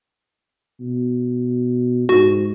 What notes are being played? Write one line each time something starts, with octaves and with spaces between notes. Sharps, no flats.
B2
G#2 F#4